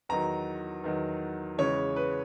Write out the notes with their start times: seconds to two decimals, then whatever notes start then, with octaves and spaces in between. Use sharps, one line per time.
0.09 E2 D#3 F#3 A#5
0.84 E2 D#3 F#3
1.58 E2 C#3 E3 G#3 C#5
1.96 B4